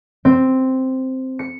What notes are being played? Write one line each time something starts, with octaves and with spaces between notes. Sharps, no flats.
C4
C#7